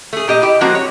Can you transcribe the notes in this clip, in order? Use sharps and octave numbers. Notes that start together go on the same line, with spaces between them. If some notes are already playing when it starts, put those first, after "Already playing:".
A3 G#4
A#2 G4 D#5
E4 G4
F3 G#3 A#3 C4 F#4 A#4
C#5